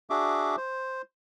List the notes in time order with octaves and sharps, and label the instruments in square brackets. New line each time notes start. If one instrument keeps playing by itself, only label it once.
[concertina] D4 F#4 G#4 E5 D6
C5